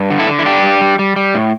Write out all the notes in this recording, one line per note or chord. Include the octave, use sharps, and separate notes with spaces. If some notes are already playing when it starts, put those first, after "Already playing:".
Already playing: G2
D3
E4 A4
D3
E4
G2 D4 G4
G3
G3
G3
G3
A2